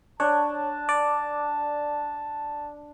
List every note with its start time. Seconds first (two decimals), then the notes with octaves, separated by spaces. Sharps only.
0.20 D4 C#5 A5
0.89 D5